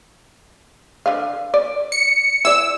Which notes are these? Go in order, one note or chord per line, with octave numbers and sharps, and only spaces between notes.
D3 B4 F5
D5
C#7
E4 D5 E6